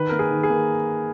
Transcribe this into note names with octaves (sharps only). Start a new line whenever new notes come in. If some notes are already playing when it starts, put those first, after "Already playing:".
Already playing: D#3 B4
A#3 A#4
G#4
D#3
G#4
A#3